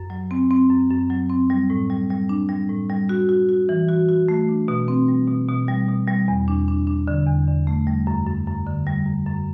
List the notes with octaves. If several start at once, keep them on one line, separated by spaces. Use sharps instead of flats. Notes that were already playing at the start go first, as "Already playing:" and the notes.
Already playing: F#2
F#3
C4
C4
F#2
F#2
F#3
C4
G3
A2
G3
G3
D4
G3
A2
G3
F#4
F#4
F#4
E3
F#4
F#4
A3
D4
B2
C4
G3
B2
B2
G3
B2
G3
E2
D4
D4
D4
D3
E2
D3
A3
G3
F#2
F#2
F#2
D3
G3
F#2
F#2